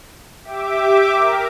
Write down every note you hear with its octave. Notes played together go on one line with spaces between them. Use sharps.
G4 E5 D6
A#4